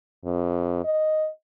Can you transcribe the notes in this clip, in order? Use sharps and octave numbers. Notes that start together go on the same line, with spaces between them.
F2
D#5